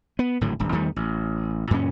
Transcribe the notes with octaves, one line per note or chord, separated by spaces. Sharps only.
B3
G#1 A2 D3 F#3
D#1 G#1 G2
E2 D#3 G3 A3
A1
F#2 A#2 C#3 C#4